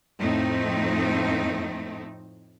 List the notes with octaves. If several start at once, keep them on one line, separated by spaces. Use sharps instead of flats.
F2 A2 A3 C4 D#4